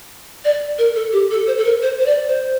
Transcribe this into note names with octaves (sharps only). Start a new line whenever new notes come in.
D5
A#4
A4
G4
A4
C5
A4
A#4
C5
C5
D5
C5